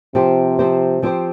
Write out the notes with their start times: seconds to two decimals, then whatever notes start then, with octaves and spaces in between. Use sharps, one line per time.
0.15 C3 F3 C4 G4 C5
0.59 F3 C4 G4 C5
1.02 F3 C4 G4 C5